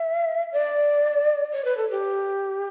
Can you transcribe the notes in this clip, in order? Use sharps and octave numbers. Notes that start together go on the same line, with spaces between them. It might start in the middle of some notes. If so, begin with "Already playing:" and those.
Already playing: E5
D5
C#5
B4
A4
G4